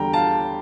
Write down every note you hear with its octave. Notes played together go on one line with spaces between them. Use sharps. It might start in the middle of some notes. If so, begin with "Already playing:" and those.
Already playing: E2 D3 G3 D4 G5 A#5
F5 A5